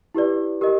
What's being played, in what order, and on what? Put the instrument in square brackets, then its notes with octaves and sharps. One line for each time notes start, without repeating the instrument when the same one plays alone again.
[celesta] E4 G4 B4 D5
G4 A#4 D#5